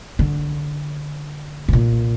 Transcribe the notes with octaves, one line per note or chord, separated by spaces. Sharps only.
D3
A2
A#2